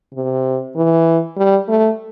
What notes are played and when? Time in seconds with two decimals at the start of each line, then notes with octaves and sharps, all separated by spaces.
0.15 C3
0.76 E3
1.37 G3
1.68 A3